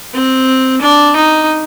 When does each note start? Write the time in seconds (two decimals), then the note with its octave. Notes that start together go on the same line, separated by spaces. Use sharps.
0.14 C4
0.82 D4
1.16 D#4